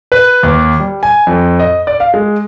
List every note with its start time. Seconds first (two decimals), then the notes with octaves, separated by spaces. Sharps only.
0.12 B4
0.43 D#2
0.80 G3
1.03 G#5
1.27 F2
1.59 D#5
1.87 D5
2.00 F5
2.14 G#3